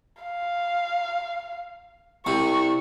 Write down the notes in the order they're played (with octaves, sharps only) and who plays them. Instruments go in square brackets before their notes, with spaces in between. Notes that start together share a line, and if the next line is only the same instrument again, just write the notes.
[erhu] F5
[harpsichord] C2 C3 [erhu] C#6